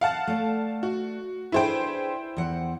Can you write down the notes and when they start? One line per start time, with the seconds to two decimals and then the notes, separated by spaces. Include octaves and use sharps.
0.01 F5 F#5 A5
0.27 A3 D5
0.83 F#4
1.52 D4 E4 G#4 B4 C5 G5
2.37 E2 F#5